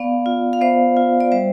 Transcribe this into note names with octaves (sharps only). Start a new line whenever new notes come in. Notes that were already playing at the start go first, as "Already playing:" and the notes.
Already playing: B3 D5 F5
F4
F5
B3 C5 E5
F4
D5
G3 C5 E5